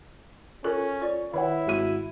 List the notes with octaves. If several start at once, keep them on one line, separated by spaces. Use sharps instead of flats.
C#4 F4 A4 A#4
F4 D5
D#3 E4 B4 C#5 F#5
G#1 F#4 D#7